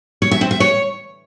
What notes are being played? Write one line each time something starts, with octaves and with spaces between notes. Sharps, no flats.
C#5
E5
C4
E5
C#5